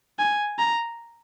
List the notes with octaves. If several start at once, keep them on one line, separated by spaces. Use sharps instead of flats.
G#5
A#5